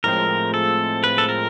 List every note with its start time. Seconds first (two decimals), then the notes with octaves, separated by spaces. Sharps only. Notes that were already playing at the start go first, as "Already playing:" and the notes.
0.04 A2 F3 G#3 C4 A#4
0.54 A4
1.04 B4
1.18 A4
1.29 A#4